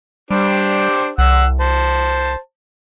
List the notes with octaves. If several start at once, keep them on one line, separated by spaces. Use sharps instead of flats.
G3 D4 G4 C5
C2 F#5 E6
C5 A5